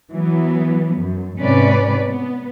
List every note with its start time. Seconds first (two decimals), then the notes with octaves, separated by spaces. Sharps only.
0.12 E3 F#3 B3
1.00 F#2
1.39 G#2 C3 C#4 B4 D5
2.07 B3